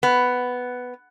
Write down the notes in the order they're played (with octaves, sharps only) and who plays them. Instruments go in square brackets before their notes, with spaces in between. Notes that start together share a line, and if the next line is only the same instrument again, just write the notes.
[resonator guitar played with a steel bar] B3